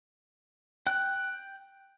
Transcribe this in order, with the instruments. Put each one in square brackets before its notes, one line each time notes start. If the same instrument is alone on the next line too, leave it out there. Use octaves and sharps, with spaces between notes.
[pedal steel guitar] G5 F#6